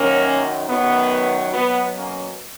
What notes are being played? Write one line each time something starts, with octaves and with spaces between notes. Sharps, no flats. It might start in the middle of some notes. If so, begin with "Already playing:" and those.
Already playing: F#2 D#3 F#3 A#3 C#4
F#2 D#3 F#3 B3
B2 F#3 B3
A#3 C#4